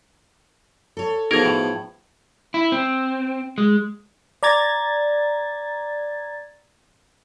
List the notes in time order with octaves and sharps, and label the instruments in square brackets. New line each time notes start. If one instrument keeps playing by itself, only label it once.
[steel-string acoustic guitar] A4 C#5
[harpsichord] B2 F3 [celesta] D#4 G#4 G#6 [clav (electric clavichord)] A#4
[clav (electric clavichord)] A2
[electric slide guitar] E4
C4
G#3
[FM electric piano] D5 A#5 G#6 A6